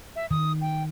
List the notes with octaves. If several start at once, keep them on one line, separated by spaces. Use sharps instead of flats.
E5
D#3 D#6
G5